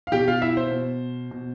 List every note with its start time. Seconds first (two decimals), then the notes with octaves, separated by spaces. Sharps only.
0.07 F5
0.12 B2 G4 G5
0.27 F4 F5
0.42 E4 E5
0.57 C5
0.71 B2
1.31 B2